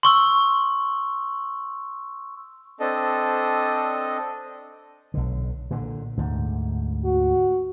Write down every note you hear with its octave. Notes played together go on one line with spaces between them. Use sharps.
C6 C#6 E6
C4 D4 A4 D#5
B1 D3
A#2 D3
D2 G#2
F#4